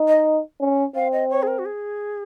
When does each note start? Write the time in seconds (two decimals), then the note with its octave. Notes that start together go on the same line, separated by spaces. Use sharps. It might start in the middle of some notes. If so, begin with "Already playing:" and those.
Already playing: D#4
0.08 D#5
0.60 C#4
0.95 C4 F5
1.12 D#5
1.30 C#5
1.43 G#4
1.47 A#4
1.59 F#4
1.65 G#4